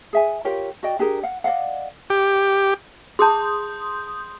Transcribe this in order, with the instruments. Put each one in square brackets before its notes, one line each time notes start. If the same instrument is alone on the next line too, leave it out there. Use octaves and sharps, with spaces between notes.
[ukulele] G#4 E5 G#5
F4 G4 A#4 C#5
F#4 D5 D#5 G5
D4 G4 G#4 A#4
F5 F#5
D5 D#5 F5 F#5
[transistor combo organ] G4
[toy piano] G#4 A5 [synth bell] C6 D#6 G6